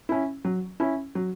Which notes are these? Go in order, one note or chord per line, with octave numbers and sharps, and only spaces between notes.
C#4 E4
F#3
C#4 E4
F#3